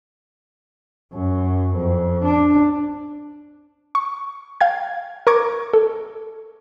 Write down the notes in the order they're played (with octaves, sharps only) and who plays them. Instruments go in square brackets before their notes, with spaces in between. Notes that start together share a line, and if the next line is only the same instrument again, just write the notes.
[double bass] F#2
F2
D4
[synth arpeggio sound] C#6
F5 G5 G#6
A#4 A#5 C#6 D6 G#6
A4